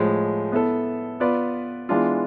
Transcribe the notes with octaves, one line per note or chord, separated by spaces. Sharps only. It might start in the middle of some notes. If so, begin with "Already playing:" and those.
Already playing: A2 F3 G#3
B3 E4 A4
B3 F4 B4 D5
E3 G#3 B3 D4 F4